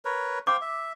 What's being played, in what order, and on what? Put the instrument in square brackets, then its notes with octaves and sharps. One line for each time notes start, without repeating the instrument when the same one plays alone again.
[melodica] A#4 B4 C#5
[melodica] C5 F5 G5 [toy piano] D6
[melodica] E5